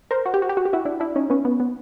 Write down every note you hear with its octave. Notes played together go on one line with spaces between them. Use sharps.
A#4 C5
F#4
G4
F#4
G4
F#4
G4
E4 F#4
D4 E4
D4 E4
C#4 D#4
B3 C#4
B3
B3